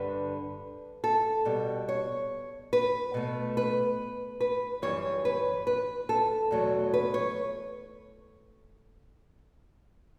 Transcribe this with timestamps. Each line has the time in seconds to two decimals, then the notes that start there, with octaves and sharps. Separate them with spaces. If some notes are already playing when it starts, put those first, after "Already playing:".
Already playing: G2 D3 G3 B4
1.04 A4
1.45 B2 G3
1.89 C#5
2.73 B4
3.14 B2 A3
3.57 B4
4.41 B4
4.82 F#2 E3 G3 C#5
5.25 B4
5.67 B4
6.09 A4
6.51 E2 B2 F#3 A3
6.94 B4
7.14 C#5